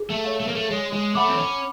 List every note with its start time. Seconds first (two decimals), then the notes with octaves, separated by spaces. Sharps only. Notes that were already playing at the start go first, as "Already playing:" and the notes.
Already playing: G#4
0.10 A3
0.24 C#5 F5
0.40 A3
0.48 A#3
0.55 A3
0.71 G#3 C#5
0.93 G#3
1.15 A3 F#5 B5 D6
1.29 C4
1.37 C#4